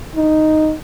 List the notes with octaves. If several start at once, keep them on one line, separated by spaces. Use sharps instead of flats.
D#4